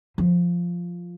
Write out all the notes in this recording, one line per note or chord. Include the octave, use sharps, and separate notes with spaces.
F3